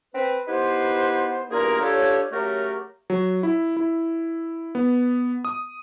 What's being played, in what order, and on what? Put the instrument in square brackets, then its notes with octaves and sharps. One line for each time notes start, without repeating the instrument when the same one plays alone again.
[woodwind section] C4 B4
B3 D#4 E4 G4 B4 C5
E2 G2 A#3 F4 G#4 A#4
D4 F4 G4 A4 C#5
C#3 F#3 A3 G4 A#4
[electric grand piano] F#3
E4
E4
B3
D#6